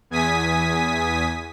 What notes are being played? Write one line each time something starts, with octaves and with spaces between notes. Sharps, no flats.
E2 G#5 D#6 B6